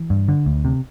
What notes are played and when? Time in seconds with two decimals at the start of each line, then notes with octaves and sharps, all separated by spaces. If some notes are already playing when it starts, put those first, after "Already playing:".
Already playing: E3
0.10 G2
0.28 D3
0.46 D2
0.65 C3